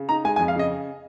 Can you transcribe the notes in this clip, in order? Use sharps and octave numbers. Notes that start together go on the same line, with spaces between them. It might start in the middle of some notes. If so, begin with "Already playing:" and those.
Already playing: C#3
D#4 A#5
G#3 G#5
G#5
F2
F5
C#3 D#5